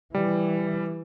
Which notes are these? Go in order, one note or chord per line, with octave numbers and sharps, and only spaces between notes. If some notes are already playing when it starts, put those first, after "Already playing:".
E3 G3